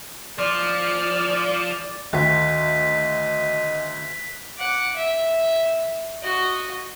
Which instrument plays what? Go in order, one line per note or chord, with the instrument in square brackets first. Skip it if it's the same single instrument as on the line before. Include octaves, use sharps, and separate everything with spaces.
[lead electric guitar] F3 [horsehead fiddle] D5
[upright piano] D2 [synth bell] D#3 [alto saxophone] D#5 [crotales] F#6 B6
[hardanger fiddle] F#5 D6
E5
F#4 D#5